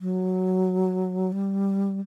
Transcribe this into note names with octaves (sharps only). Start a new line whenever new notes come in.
F#3
G3